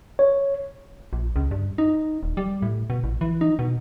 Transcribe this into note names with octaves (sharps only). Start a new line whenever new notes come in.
C#5
A#1
C#2
G2
D#4
D#1
G3
A2
B2
A1
E3
D#4
B2